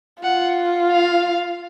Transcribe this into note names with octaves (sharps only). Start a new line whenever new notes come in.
F4 F#5
F5